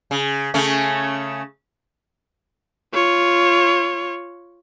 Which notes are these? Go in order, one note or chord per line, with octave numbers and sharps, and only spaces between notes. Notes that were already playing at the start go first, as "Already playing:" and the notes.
C#3
C#3 A3 C#4
F4 C#5